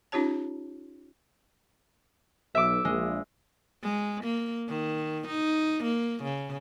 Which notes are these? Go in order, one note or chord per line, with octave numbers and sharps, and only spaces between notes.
C#4 D#4 F4 G4 C#5 A5
B1 E5 D6
A#1 G#3
G#3
A#3
D#3
D#4
A#3
C#3